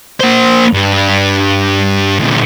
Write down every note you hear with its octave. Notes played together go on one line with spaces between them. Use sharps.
A#3 C5
G2
D2 A#2